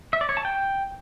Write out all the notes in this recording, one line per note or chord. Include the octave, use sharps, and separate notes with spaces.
E5
D5
C#5
A5
G5